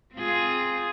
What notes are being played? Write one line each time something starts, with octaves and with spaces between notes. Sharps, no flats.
C4 F4 G#4